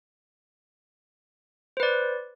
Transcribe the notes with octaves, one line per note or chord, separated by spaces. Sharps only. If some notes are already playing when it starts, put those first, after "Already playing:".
B4 C5 D5